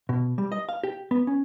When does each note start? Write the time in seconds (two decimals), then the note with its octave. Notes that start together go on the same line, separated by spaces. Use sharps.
0.09 B2
0.38 G3
0.52 D#5
0.69 F5
0.84 G4
1.11 B3
1.27 C#4